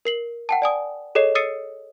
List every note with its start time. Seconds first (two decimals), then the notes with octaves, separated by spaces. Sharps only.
0.05 A#4 C7 F#7
0.49 F#5 G5 A5
0.62 D5 G#5 D#6
1.15 G#4 A4 C#5 D#5 C7
1.35 D#6 E6 A6 C7 C#7 D#7